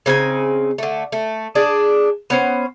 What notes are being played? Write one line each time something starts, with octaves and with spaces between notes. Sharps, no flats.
C#3 C4 D#4 G#5
D3 A3
A3
D4 G#4 D5
B3 C#4 C5